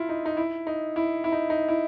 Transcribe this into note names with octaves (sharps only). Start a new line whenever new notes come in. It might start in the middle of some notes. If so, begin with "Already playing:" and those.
Already playing: E4 F4
D#4
D#4
E4
D#4
E4
E4
D#4
D#4
E4